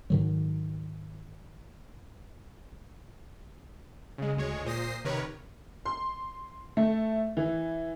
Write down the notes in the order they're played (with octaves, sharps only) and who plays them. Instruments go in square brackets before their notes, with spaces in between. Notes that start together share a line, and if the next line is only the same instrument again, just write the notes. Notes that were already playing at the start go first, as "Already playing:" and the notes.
[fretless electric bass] G#2 D#3 F#3
[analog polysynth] C#3 G#3
D2 G#3 C#5
A#2 C5 D#6 A#6 C7
C3 D#3 A#4 B4 C#5
[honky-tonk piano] C6
A3
E3